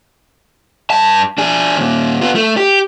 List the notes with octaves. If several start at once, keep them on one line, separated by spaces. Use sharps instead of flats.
G2 A5
D4 G#4
D#2 A#2
B3 F4
A3
G4